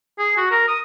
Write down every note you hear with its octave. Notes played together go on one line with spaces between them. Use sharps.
G#4
F#4
A#4
D#6